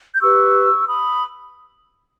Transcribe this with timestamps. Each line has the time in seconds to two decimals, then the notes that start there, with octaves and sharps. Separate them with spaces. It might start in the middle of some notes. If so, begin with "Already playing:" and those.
0.14 G6
0.21 G4 B4 C#6 E6
0.88 B5 D#6